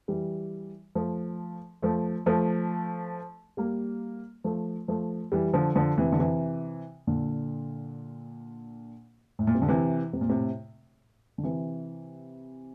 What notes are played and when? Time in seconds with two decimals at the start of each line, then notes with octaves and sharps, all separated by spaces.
0.08 E3 G3
0.95 F3 A3
1.82 F3 A3
2.26 F3 A3
3.57 G3 A#3
4.44 F3 A3
4.88 F3 A3
5.32 E3 G3
5.54 D3 F3
5.76 D3 F3
5.98 C3 E3
6.12 D3
6.19 C3 E3
7.07 A#2 D3
9.39 A2
9.47 A#2
9.55 C3
9.62 D3
9.68 C3 E3
10.13 C3
10.21 A#2
10.29 A2 C3
11.38 D3
11.44 C3 E3